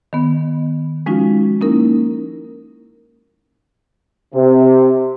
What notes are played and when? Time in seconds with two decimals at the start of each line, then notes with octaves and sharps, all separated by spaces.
0.13 D#3 B3
1.06 F3 G#3 C#4 D#4 F4 F#4
1.61 A#3 C#4 D#4 E4 A#4
4.34 C3